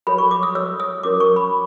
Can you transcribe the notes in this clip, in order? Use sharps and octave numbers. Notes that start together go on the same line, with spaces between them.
F#4 A4 C#5 B5
C#6
D6
D#6
F#4 A4 C#5 E6
D#6
C#4 F#4 A#4 C#5 D6
C#6
B5